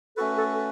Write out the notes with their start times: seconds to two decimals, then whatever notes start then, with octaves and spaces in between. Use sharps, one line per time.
0.17 A3 C#4 F#4 A4 B4
0.37 A4